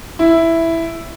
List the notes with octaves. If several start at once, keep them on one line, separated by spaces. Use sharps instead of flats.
E4